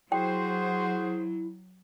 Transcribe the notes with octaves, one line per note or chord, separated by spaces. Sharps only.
F#3 E4 F#4 G#4 C5 G5